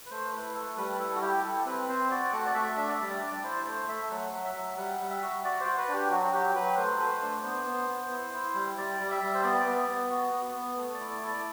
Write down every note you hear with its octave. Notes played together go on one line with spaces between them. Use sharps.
B4
A3 C5
E4 B4
A3 A4
G3 B4
E4 A4
F#4
E4 G4
E4 A4
C4 B4
C4 C5
F#4 D5
A3 F#5
D5
A3 E5
D4 E5
D5
E5
G3
D5
D4 D5
E4 C5
A3 C5
A3 E5
F#3 F#5
F#3
E5
F#3
G3 F#5
G3
E5
F#4
F#4 D5
C5
F#4
B4
D4 G4
F#3 F#4
F#4
F#3 G4
F#3 B4
A3 C5
A3 B4
C5
D4
B3 C5
B3
B3
E4
E4
G3
G3 D5
G3
E5
G3
C5
B3 D5
B3
B3
F#4
B3
B3
A3
D5
E4
D5
E4
D5